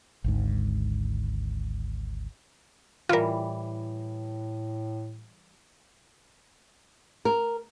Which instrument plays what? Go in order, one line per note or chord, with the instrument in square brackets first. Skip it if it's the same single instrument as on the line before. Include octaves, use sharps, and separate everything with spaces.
[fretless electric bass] G#1 D2 G#2
[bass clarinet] A2 [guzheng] E3 G3 [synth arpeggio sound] F4 A#4
[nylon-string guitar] A#4